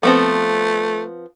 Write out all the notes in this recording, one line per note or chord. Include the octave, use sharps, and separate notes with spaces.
F3 A3 B3 C4